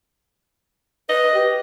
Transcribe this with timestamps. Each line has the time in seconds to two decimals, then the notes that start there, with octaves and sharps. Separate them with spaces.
1.09 B4 D#5
1.34 G4